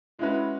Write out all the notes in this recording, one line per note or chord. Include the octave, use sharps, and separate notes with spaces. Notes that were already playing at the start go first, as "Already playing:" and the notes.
G#3 C#4 E4 F#4 B4